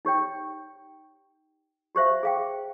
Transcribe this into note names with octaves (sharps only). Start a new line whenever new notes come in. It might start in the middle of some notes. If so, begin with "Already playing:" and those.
D#4 G4 C#5 G5
F#4 G4 C5 E5 F5
G#4 F5 G5